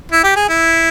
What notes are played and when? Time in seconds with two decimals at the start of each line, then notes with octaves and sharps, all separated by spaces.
0.12 E4
0.24 G4
0.36 G#4
0.49 E4